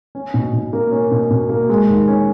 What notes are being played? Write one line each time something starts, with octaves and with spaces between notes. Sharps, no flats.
C#4
B2
B2
A#3
C#4
B2
B2
A#3
G#3
D#2
C#4